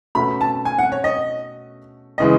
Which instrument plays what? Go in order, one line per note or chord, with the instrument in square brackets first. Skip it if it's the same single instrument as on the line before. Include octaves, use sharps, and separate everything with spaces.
[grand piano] B2 A3 C#4 F#4 [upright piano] B5
[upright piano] A5
G#5
F#5
C#5
D#5
[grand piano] C#3 E3 G#3 [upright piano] D#5